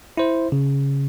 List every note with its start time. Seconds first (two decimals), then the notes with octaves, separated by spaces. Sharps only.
0.17 E4 C5
0.52 C#3